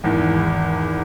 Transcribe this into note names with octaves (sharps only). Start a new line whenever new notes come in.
G#1 E2